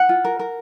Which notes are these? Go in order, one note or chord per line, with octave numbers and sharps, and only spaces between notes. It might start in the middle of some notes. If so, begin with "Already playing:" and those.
Already playing: F#5
F4
A#4
A#4